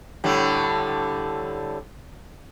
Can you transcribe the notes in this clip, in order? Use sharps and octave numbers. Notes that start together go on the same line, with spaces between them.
A2 D3 G3